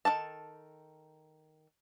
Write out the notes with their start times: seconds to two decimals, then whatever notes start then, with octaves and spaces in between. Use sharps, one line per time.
0.05 D#3 F#3 A4 A5